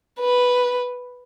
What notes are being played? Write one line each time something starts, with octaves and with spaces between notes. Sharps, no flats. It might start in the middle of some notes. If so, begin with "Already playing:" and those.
B4